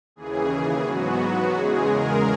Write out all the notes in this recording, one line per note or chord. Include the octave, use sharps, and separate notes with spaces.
D#2 C#3 E3 G#4
G#2 F#3 B3 F#4
F#4
E2 C#3 G#3 G#4
A#4